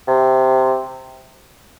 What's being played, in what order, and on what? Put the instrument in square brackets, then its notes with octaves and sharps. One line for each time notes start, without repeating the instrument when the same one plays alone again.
[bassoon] C3